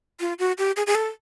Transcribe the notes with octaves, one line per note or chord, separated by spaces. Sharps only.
F4
F#4
G4
G#4
G#4
A4